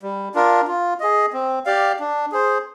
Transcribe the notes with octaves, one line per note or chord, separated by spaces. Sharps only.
G3
D4 F4 A#4
F4
G#4 D#5
C4
G4 D5 F5
D4
G#4 C5